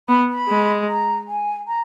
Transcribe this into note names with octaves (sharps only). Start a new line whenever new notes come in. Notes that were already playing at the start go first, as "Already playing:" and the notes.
B3 B5
B5
G#3
A#5
G#5
A#5